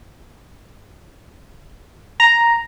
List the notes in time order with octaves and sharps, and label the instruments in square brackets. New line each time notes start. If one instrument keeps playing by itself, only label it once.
[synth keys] A#5